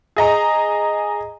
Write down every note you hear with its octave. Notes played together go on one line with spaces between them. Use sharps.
G#4 D#5 A#5